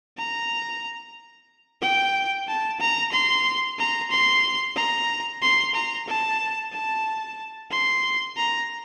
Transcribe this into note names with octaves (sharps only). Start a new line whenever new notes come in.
A#5
G5
A5
A#5
C6
A#5
C6
A#5
C6
A#5
A5
A5
C6
A#5